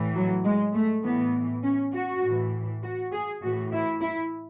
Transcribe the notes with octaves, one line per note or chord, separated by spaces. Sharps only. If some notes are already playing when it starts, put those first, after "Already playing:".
Already playing: A2 E3
F#3
G#3
A3
A2 E3 B3
C#4
F#4
A2 E3
F#4
G#4
A2 E3 F#4
E4
E4